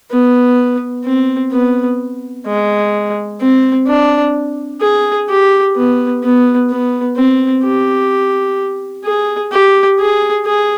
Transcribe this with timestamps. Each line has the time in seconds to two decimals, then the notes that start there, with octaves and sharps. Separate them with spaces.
0.11 B3
1.05 C4
1.52 B3
2.46 G#3
3.41 C4
3.87 D4
4.81 G#4
5.29 G4
5.76 B3
6.23 B3
6.70 B3
7.17 C4
7.64 G4
9.05 G#4
9.52 G4
9.99 G#4
10.46 G#4